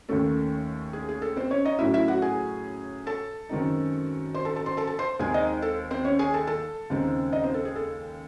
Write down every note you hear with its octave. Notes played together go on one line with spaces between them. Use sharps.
D#2 D#3 A3 C#4 A4
G#4
G#4
A4
C4 C5
C#4 C#5
D#4 D#5
A2 F#3 C#4 E4 E5
E4 E5
F#4 F#5
G#4 G#5
A4 A5
F#2 D#3 G#3 C4 D#4
C5 C6
A4 A5
A4 A5
C5 C6
A4 A5
A4 A5
C5 C6
D#2 D#3 G#3 C4 D#4 G#4 G#5
D#4 D#5
A4
C4 C5
C#4 C#5
G#4 G#5
A4 A5
A4 A5
D#2 C#3 G#3 C4 D#4
D#4 D#5
C4 C5
A4
G#4
A4